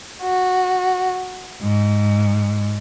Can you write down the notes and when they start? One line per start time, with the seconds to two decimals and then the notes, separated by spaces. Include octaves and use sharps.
0.22 F#4
1.60 G#2